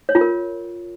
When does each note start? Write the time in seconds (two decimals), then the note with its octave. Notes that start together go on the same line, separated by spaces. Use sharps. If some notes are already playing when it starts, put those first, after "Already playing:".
0.09 C#5
0.15 F4
0.21 A#4